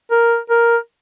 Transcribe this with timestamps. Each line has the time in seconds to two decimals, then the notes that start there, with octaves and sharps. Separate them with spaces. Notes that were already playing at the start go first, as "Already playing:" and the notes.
0.11 A#4
0.50 A#4